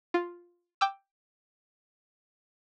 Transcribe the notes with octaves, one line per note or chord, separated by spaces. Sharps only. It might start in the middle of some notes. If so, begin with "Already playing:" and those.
F4
G5 D6 E6